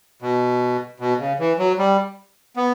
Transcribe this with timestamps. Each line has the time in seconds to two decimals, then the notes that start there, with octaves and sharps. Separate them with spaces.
0.22 B2
1.00 B2
1.19 C#3
1.39 E3
1.59 F#3
1.79 G3
2.57 B3